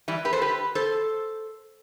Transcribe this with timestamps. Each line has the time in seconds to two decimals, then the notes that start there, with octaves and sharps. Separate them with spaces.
0.08 E3 G3
0.25 G4 B4
0.33 A4 C5
0.42 G4 B4
0.75 A4 C5